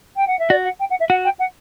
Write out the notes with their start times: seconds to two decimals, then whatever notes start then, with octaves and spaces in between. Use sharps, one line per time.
0.16 G5
0.27 F#5
0.39 E5
0.50 F#4 D5
0.65 F#5
0.79 G5
0.90 F#5
1.00 E5
1.10 F#4 F#5
1.24 G5
1.39 F#5